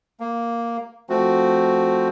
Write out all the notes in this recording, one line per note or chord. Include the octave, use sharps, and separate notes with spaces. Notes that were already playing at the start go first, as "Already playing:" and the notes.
A#3
F3 A3 C4 F#4